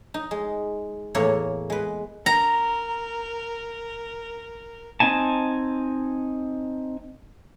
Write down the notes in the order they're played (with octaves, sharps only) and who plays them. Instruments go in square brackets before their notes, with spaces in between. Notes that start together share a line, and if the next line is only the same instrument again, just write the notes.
[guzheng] D#4
G#3
E2 A2 A#3 E4 C#5
G#3 B4
[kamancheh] A#4 [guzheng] A#5
[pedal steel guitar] C4 D#4 G#5 A5